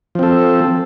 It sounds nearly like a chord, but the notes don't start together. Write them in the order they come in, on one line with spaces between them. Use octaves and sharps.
F3 C4 A4